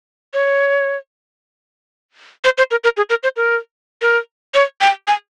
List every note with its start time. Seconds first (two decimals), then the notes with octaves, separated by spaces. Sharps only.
0.34 C#5
2.44 C5
2.58 C5
2.71 A#4
2.84 A#4
2.97 G#4
3.10 A#4
3.23 C5
3.36 A#4
4.02 A#4
4.54 C#5
4.81 G5
5.08 G#5